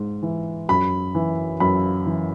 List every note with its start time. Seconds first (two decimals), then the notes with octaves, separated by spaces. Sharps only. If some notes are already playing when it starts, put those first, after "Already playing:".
Already playing: G#2
0.22 E3
0.69 F#2 B5
1.15 E3
1.60 F#2 B5
2.06 E3